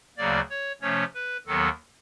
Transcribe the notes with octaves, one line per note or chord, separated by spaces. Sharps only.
D2 C#3 F#3 A#3 D5
C#5
C3 F3 A3 C#4 C#5
B4
D#2 D#3 F#3 B3 A4